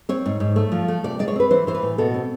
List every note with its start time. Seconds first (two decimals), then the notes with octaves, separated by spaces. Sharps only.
0.09 C4 C#5
0.26 G#2
0.40 G#2
0.56 A3
0.72 F3
0.88 A3
1.04 C3 D5
1.19 G#3 D5
1.28 C#5
1.36 C4 B4
1.50 E3 C5
1.67 E3 C5
1.75 B4
1.82 A2
1.98 B2 A4
2.14 C4